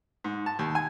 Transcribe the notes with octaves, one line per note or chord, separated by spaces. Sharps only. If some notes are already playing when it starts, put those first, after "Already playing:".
G#2
A5
D#2
G#5